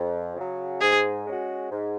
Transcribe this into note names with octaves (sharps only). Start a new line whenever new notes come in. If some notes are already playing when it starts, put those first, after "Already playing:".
Already playing: F2
C#3 F#3
G#2 G#4
G#3 C#4 F#4
G#2